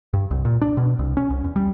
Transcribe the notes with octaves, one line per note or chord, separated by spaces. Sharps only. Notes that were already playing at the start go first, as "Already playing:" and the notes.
G2
C2
A#2
D4
B2
C2
C#4
C2
E2
G3